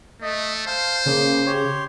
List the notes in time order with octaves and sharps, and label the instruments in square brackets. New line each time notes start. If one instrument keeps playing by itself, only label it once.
[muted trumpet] A3 [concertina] D#5
[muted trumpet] C5 [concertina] F5 A5
[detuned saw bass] C#3 [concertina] A#3
[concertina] G4 C#5 C6